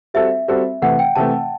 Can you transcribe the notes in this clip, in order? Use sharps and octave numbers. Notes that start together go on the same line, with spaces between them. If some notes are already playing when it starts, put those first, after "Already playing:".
G3 C4 F#4 A4 E5
G3 C4 F#4 A4
C3 E3 A3 F#5
G5
C3 E3 A3 A5